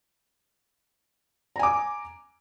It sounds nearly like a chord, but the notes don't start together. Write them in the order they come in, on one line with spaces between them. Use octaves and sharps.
A#5 G#5 D6